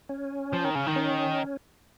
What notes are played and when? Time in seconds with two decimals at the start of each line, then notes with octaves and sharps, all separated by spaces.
0.09 C#4
0.53 F3
0.65 D#3
0.75 C#3
0.86 D#3
0.96 C#4